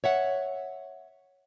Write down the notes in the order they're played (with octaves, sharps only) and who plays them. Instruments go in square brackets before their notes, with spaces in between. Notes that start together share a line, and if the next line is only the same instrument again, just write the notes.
[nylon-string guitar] C#5 E5 F#5